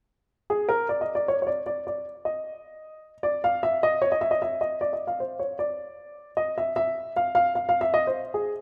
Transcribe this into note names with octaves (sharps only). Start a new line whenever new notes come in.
G#4
A#4
D5
D#5
D5
C#5
C#5
D5
D5
D5
D#5
D5
F5
E5
D#5
C#5
D#5
E5
D#5
E5
D#5
D5
D#5
F5
C5
C#5
D5
D#5
E5
E5
F5
F5
F5
F5
E5
D#5
C5
G#4